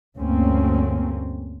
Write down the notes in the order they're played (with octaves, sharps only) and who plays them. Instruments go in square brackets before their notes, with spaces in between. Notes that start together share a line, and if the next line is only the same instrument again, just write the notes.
[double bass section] D2 G2 A#3 C4 C#4